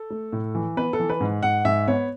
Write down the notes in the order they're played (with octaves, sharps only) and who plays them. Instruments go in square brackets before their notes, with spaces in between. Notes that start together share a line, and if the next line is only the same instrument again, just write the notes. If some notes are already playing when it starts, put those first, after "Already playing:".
Already playing: [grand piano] A4
A3
A2
E3
B3 B4
A4
E3
B4
G#2
G#2 F#5
G#2 E5
B3 C#5